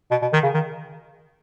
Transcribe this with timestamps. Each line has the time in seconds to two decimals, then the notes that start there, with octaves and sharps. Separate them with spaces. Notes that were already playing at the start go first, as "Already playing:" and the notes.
0.11 B2
0.22 B2
0.33 D#3
0.43 C#3
0.54 D#3